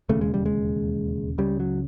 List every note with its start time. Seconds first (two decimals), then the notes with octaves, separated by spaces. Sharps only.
0.09 E1 D#2 C#3 A3
0.21 G#3
0.34 G3
0.46 G#3
1.38 C#2 C#3 G3
1.60 F#3